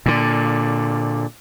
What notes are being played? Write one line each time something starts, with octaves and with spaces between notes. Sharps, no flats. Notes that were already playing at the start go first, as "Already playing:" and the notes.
A#2 D3